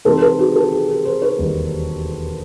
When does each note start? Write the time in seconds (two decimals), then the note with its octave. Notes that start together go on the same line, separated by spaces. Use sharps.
0.05 C3 E3 G#3 C4 D#4 G4 A4
0.21 A4 B4
0.38 F#4 G#4
0.55 G4 A4
0.72 G#4 A#4
0.88 G#4 A#4
1.05 A#4 C5
1.22 B4 C#5
1.38 E1 D#2 D#3 G3